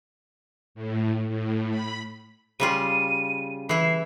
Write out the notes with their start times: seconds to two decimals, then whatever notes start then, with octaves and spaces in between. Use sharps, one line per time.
0.75 A2
1.28 A2
1.70 B5
2.60 C#3 G3 F4 D#7
3.69 E3 E4 C7